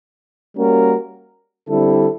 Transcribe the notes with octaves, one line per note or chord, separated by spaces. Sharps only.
G3 A#3 C#4 F#4 A#4
D3 G3 C4 E4 A4